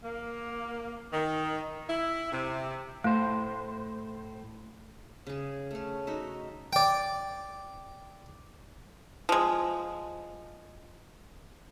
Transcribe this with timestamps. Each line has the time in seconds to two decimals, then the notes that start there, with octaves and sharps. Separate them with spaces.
0.03 A#3
1.12 D#3
1.88 E4
2.32 C3
3.04 A2 A3 C5
5.27 C#3 G#4
5.71 A3 C#4
6.07 D#4 F#4 E5
6.73 D5 G5
9.29 F3 G#3